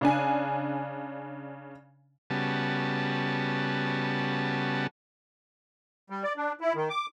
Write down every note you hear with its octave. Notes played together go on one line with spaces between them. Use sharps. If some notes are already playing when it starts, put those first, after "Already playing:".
C#3 D4 G#5
C#3 G3 B3 F#4 A5
G3
D5
D4
E4
D#3
D6